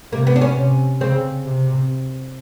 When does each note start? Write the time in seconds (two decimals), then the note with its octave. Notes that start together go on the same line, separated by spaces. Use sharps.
0.12 C3 A#3
0.27 B3
0.36 D4
0.41 C#4
0.56 C3
1.01 C#3 C4
1.45 C3